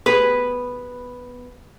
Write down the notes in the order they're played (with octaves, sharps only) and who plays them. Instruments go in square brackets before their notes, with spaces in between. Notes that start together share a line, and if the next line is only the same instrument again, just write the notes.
[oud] B3 G4 G#4 [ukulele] B4